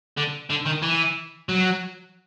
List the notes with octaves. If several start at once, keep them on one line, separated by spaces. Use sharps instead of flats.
D3
D3
D#3
E3
F#3